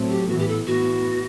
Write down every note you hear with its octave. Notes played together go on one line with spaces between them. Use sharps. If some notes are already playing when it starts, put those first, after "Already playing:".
Already playing: A2 F#3 A3 C4
G4
A2 E3 B3 F#4
G4
A4
A2 E3 B3 F#4